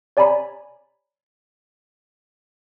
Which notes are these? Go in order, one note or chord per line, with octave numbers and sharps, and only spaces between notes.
C#5 D5 G#5 A#5 B5